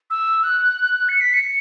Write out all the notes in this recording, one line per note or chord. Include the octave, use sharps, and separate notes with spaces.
E6
F#6
C#7
B6
C#7